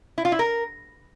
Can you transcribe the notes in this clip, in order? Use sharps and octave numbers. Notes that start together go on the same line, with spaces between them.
E4
F4
E4
A#4